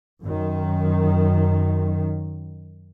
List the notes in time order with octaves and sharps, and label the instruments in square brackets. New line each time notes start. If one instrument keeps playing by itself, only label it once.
[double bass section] F#2 D#3